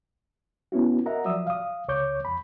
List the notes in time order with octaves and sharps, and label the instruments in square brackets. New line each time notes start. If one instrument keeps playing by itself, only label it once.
[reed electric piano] B3 C#4 E4 F#4
A#4 D#5 E5 F#5 A#5
F3 F#3 D5 E5 D#6 E6
F5 D#6
C#2 C#5 C#6 D6 G6
F2 B5